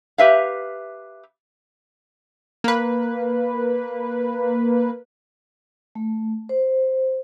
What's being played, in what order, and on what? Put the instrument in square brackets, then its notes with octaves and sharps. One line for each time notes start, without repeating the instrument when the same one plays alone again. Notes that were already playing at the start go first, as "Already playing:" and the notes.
[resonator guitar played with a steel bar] G4 B4 E5 F5
[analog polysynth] A#3 B4
[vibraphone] A3
C5